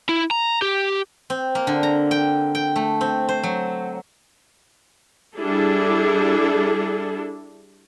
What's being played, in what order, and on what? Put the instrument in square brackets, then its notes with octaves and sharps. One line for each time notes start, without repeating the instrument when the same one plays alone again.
[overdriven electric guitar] E4
A#5
G4
[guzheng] C4
A#3
D3
A#5
G5
G5
A3
C4
C5
F#3
[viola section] G3 D4 E4 G#4 A4